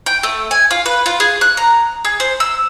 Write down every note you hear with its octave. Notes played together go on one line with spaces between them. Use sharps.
G5
A3
G#5
F4
B4
F4
G#4
F#6
A#5
G#4
C5
E6